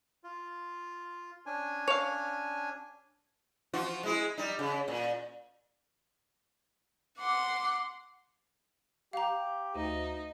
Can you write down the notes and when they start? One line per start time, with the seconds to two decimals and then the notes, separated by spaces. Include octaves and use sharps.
0.24 F4
1.46 C#4 D4 G#5
1.88 C#5 F5
3.74 F3 F4 F#4
4.03 G#3 E4 G#4
4.38 G3 D#4
4.59 C#3
4.88 A#2
7.19 F#5 C6 D6
9.13 G4 F5 A#5
9.75 D2 D#4